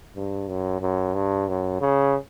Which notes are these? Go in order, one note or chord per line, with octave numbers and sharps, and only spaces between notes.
G2
F#2
F#2
G2
F#2
C#3